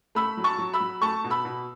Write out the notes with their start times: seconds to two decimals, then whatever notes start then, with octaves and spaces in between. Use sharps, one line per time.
0.15 A3 B5 E6
0.37 F#3
0.44 A5 C#6
0.58 F#3
0.73 B5 E6
0.81 F#3
1.01 A3 A5 C#6
1.24 B2
1.30 B5 E6
1.45 B2